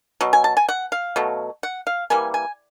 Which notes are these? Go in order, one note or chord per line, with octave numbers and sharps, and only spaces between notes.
B2 F#3
G#5
A5
G#5
F#5
F5
B2 F#3 A3
F#5
F5
E3 G3 A#3 G#5
G#5